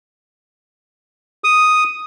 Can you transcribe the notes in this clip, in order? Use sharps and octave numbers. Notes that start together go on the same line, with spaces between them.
D#6